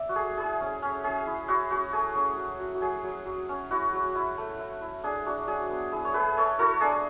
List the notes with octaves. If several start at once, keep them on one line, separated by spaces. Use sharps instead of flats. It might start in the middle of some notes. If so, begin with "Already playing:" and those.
Already playing: D5 E5
F#4
A3 G#4
E4 G#4
C#4
C#4
C#4 G#4
E4
E4 F#4
C#4 F#4
A3 G#4
C#4
F#3
F#3
F#4
F#3 G#4
F#3
F#3
C#4
E4 F#4
F#3
E4
A3
E4
E4
D4 G#4
D4 F#4
F#3 G#4
B3
E4 G#4
C#5
A3 G#4 B4
A3 A4 C#5
E4 F#4 A4
D4 G#4